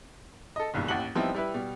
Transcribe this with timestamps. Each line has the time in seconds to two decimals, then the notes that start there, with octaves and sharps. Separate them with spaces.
0.56 A4 D#5
0.74 F#1 B1 G2 D#3
0.88 A1 D#2 G4 F#5 F#7
1.15 F3 G3 B3 C4 D#4 E4
1.34 G3 E4 B4
1.54 B2 G3